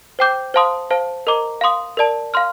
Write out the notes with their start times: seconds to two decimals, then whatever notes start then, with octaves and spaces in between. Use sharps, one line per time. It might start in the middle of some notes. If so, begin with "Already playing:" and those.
0.19 C5 G5 D6 G6
0.54 C5 F5 A5 C6 D#6
0.91 C5 F5 A5
1.27 A#4 D#5 A#5 D6
1.61 F5 C6 D#6
1.97 A#4 D5 A5
2.34 F5 C6 F6